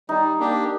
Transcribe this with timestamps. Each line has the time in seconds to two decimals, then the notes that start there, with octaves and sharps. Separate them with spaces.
0.09 G3 D#4
0.40 A#3 D4 G4